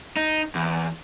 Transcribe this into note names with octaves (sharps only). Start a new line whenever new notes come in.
D#4
E2